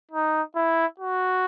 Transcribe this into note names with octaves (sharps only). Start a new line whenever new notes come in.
D#4
E4
F#4